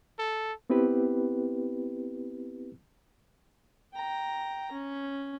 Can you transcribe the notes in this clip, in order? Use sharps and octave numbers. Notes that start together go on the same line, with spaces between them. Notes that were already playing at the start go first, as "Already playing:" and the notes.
A4
B3 C4 E4 G4 B4
G5 A#5
C#4